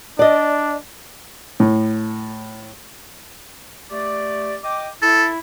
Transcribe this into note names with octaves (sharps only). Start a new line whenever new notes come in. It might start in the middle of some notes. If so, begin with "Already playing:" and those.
D4 D5 D#5
A2
A3 G4 D5
D#5 G5 D6
E4 A4